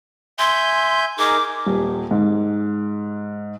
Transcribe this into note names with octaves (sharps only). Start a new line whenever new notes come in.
E5 G#5 C6 G6
D#4 G#4 A#4 D6
D#1
G#2